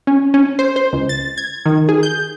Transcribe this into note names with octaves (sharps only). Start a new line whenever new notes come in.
C#4
C#4
C5
C5
C#2
A6
G#6
D#3
G#4
G6